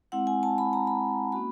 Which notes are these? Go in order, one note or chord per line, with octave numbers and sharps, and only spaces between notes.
G#3 C4 E4 F#5
G#5
A5
B5
A#5
B5
A#3 C#4 F#4 B5